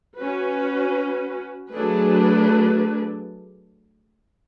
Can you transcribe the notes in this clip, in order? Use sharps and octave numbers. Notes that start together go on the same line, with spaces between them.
C#4 F#4 B4
F#3 A3 D4 G#4 B4